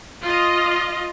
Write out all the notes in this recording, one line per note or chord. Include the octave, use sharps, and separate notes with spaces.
F4 D#5